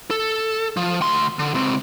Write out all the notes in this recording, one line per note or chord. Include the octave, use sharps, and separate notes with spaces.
A4
F3
D2 C6
D3
C#2 C4